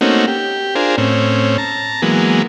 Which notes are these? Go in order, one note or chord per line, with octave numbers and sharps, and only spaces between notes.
A3 A#3 C4 C#4 D#4 F#4
G4
D4 F4 G#4 A#4 C5
A2 C4 C#4
A5 A#5
E3 F#3 G#3 A#3 B3